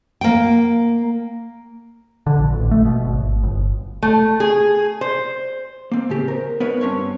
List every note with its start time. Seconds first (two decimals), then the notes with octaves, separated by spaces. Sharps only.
0.21 A#3 G5
2.27 D3
2.39 A#1
2.53 A1
2.71 A3
2.85 B2
3.06 G#1
3.43 G1
4.03 A3
4.40 G#4
5.01 C5
5.92 A#3 C4
6.09 A2 C#3 G4
6.28 A#4 C5
6.60 B3 A#4 B4 C#5
6.81 G2 C4 C#4 C#5